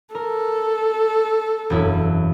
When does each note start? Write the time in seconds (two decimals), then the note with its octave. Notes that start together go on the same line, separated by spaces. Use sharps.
0.15 A4 A#4
1.70 E1 F#2 E4